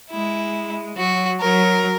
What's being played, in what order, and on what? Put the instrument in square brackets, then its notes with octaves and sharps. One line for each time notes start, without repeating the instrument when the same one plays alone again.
[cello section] G#3 [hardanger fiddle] E4
[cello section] F#3 [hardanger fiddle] F#4
[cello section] F#3 [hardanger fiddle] A#4